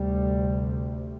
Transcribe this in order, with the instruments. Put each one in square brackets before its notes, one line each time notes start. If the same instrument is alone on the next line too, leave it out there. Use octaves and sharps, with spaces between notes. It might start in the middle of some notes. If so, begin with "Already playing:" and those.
Already playing: [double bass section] D2 C3 G3